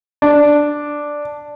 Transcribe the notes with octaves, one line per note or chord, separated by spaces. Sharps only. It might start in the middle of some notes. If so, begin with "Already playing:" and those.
D4